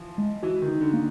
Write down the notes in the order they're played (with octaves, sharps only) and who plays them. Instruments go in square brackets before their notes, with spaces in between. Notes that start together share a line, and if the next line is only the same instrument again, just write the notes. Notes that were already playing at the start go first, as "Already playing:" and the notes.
Already playing: [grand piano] E3 F3
[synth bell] G#3
[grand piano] E3 [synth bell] F#4
[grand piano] D#3
[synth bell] D#4
[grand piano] D3
[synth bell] A#3